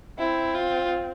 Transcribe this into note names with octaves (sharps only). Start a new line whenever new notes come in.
C4 E4
F4